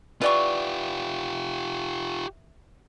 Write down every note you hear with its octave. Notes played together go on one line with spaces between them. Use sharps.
E3 F4 G4 D5 C#6